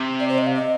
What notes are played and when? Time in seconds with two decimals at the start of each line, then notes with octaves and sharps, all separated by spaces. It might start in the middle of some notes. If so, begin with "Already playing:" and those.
Already playing: C3
0.20 D5
0.29 C5
0.38 D#5
0.47 F5
0.55 D#5